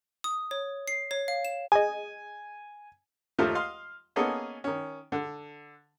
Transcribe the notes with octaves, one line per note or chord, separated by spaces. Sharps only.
D#6
C#5
C7
C#5
F5
E7
G#4 D#5 G#5
D#2 F3 A3 D#4 F4 F6
D#5 F5 C6
A#3 B3 C#4 D#4 G#4 A4
D#3 C#4
D3